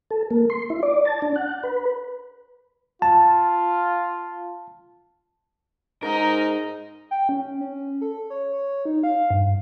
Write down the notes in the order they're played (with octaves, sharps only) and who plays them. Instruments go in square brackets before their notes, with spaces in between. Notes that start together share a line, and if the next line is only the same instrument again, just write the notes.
[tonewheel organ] A4
A#3
C6
E4
D5
A5
D4
F#5
B4
[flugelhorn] F4 [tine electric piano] A5
[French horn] G#2 [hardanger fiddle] D#4 [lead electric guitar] A#4
[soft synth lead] G5
C#4
C#4
A4
C#5
C#5
D#4
F5
G2